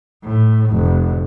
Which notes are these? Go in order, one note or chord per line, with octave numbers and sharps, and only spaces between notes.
A2
F1